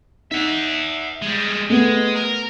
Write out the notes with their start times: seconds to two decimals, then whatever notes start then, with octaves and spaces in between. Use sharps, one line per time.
0.31 D#4 E5 F#5
1.22 G3 G#3
1.70 G#3 A3 B3
2.16 A#4